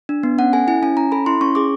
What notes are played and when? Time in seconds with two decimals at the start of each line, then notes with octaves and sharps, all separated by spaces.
0.09 D4
0.23 B3
0.39 C#4 F#5
0.53 A4 G#5
0.68 E4 G#5
0.83 C#4 G#5
0.97 C#4 A#5
1.12 A4 B5
1.26 E4 C6
1.41 C#4 C#6
1.55 G#4 D6